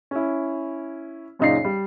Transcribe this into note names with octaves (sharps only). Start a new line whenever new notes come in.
C#4 E4
F#2 A#2 C#3 D#4 D5 C7
G3